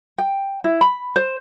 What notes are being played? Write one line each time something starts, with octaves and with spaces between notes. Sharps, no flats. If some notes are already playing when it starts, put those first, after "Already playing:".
G5
E4
B5
C5